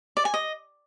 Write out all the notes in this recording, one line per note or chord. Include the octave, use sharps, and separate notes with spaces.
D5
G#5
D#5